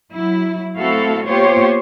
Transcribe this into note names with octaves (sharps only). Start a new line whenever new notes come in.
F#3 E4
A3 C4 E4 F#4 A4 F5
A#3 B3 F4 G4 C5 C#5